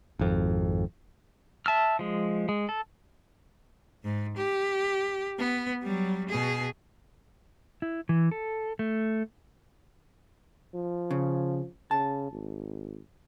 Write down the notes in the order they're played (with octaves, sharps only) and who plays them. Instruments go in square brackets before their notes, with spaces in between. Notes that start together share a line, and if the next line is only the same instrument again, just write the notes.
[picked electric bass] G#1 F2
[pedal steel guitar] E5 A5 E6 F6
F3 G#3
G#3
A4
[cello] G#2
G4
B3
F#3 G3
B2 G#4
[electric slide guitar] E4
E3
A4
A3
[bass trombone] F3
[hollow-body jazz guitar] C#3
[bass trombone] C#3 [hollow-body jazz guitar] A5
[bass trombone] G#1